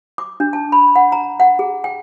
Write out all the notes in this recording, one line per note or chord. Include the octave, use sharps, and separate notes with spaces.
D6
D4
A5
B5
F#5
A#5
F#5
G#4
G5